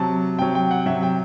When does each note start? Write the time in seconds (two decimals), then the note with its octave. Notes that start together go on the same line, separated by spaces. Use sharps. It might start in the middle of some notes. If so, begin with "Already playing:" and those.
Already playing: C3 F#3 A5
0.39 C3 F#3 G5
0.55 G5
0.71 F#5
0.86 C3 F#3 E5
1.03 G5